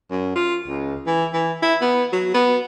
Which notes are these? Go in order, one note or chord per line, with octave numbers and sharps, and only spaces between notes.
F#2
F4
C#2
E3
E3
E4
B3
F#3
B3